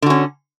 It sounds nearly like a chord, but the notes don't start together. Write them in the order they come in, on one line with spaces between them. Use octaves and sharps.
D3 F#4 C#4